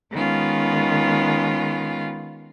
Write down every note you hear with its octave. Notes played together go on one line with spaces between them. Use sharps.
D#3 G#3 B3 C#4 F4